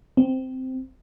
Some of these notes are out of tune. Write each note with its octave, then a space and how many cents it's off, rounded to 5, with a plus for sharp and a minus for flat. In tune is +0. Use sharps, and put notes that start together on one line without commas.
C4 -10